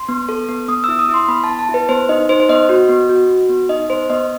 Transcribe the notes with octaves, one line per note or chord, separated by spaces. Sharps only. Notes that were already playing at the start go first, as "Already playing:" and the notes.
Already playing: C6
B3
A4
B3
B3 D#6
E4 E6
D#6
E4 C6
B3 B5
B3 A5
A5
E4
B4
B3 C5
D#4 D#5
D#4 C5
C5
B3 D#5
F#4
B3
F#4
F#4
B3
D#4 D#5
B3 C5
B3 D#5